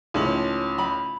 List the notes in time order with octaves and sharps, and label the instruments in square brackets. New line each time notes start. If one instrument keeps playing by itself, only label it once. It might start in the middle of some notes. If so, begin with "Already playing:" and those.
[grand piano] C#2 C#4 F#7 [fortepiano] A2 D#3 F3
[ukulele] B5